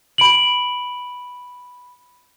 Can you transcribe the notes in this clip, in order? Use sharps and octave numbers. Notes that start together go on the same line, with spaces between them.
B5 D7 F#7